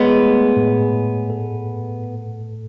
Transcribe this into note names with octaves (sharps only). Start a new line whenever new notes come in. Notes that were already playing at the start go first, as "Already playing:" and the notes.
Already playing: G#3 B3 C#5
A3
A2
A2
A4